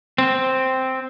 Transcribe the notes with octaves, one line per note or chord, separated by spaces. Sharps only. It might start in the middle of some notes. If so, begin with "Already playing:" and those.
C4